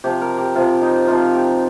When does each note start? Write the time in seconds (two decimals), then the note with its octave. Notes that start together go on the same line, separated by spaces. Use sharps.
0.04 C3 F3 G4
0.21 A#4
0.38 G4
0.55 C3 F3 F4
0.82 D#4
1.08 C3 F3 F4
1.35 G4